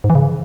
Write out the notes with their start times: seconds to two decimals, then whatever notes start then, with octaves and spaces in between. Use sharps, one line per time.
0.04 G#2
0.10 E3
0.15 C#3